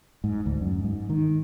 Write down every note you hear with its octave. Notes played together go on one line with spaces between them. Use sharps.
G#2
D2
F#2
G#2
D#3